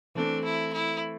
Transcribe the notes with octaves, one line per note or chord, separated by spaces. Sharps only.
E3 A3 C4 D4
E4
E4